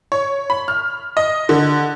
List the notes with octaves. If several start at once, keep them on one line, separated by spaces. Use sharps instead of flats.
C#5
B5
F6
D#5
D3